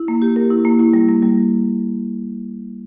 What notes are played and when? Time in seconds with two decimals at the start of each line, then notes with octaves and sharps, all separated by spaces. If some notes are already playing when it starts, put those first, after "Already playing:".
Already playing: E4
0.08 A#3
0.22 G4
0.36 A#4
0.50 E4
0.65 A#3
0.79 E4
0.94 G3
1.08 A#3
1.23 G3